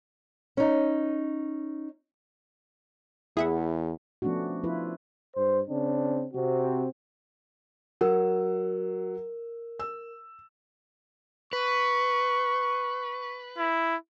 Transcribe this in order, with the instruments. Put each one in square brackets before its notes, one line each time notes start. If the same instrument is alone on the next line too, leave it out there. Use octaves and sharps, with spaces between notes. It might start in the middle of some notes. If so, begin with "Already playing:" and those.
[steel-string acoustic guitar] C#4 D#4
[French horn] E2 [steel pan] E4 [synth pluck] G#4 E5 F#5
[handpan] F3 A3 B3 C#4 D4 F#4
F3 E4 F4 B4
[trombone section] G2 C5
C#3 C4 D4
C3 C4 F#4
[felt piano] F#3 F#5 E6 [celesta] A#4
[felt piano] E6
[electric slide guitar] B4 [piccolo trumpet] C#6
[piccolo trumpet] E4